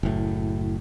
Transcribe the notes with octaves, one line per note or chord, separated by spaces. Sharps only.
F#1 A2